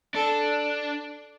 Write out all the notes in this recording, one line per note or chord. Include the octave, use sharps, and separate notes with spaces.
D4 A4